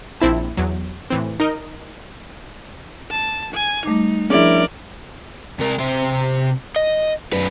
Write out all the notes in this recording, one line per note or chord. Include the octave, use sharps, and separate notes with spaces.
A#1 C4 E4 A5
E2 F#3
A2 E3 C4
D#4 A#4 D#5
A5
G#5
G3 A3 D#4 D6
F3 C#4 D4 E4 G#4 A#4 D5
C3 A#4
C3 C5
D#5
F#2 B4